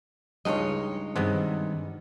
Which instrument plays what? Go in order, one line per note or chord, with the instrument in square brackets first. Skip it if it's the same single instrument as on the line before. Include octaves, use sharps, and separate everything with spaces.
[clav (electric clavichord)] C#2 G2 D#5 [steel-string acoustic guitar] G#3 D#4 C#5
[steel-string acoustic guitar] G2 D#3 [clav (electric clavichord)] C3 G#3 B3